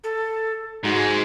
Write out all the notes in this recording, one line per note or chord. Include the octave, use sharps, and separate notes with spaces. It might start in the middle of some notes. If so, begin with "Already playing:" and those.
A4
G#2 G#3 F#4